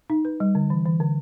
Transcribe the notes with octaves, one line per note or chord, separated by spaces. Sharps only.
D#4
B4
G3
D3
E3
E3
D3